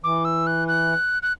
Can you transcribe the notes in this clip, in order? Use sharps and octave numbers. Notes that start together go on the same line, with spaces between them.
E3 D6
E6
F#6
F#6
F#6